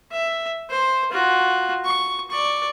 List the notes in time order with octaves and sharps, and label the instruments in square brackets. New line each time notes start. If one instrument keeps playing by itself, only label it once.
[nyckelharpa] E5
C5
F4 F#4
C#6
D5 C#6